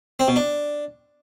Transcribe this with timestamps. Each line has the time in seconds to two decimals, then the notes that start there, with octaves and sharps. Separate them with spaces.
0.20 C4
0.28 B2
0.36 D4